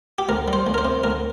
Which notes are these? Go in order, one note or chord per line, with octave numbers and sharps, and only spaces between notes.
G4
D2 A#4
G3
C5
D2
A#4
C5
C3
D2 A#4